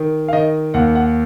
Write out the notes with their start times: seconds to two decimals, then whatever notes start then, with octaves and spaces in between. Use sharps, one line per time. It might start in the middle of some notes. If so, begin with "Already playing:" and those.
Already playing: D#3
0.28 F5
0.33 D#3 D#5
0.74 D#2 F#5
0.95 F#5